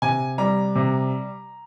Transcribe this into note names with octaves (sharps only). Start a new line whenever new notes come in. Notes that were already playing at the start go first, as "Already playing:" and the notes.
C3 G#5
G3 A#5
C3